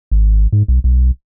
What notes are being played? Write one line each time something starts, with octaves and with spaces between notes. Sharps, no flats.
G#1
G#2
B1
B1